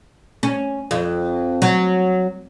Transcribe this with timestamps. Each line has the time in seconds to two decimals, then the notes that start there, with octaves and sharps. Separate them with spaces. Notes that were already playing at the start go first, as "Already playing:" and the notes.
0.43 C#4
0.91 F2
1.62 F#3